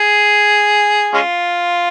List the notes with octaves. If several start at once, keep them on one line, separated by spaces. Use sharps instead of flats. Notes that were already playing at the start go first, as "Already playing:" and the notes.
Already playing: G#4
G#3 C#4 F4